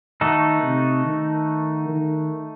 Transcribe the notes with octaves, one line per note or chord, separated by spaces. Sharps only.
D#3 A3 D#4 F#4 A4
C3
D#3
D#3